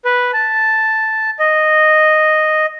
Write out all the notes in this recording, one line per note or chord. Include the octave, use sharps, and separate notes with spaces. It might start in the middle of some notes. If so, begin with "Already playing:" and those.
B4
A5
D#5